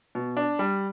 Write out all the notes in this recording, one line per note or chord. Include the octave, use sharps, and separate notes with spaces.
B2
D4
G3